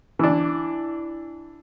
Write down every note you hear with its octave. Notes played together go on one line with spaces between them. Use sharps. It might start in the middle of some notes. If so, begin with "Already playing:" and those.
E3 D4